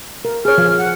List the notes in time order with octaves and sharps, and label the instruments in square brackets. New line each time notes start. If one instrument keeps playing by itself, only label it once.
[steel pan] A#4
[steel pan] G#4 C#5 [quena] F6
[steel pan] F3
[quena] F#5